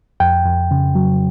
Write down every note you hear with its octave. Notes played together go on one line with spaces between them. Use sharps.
F2 G5
F2
C#3
F#3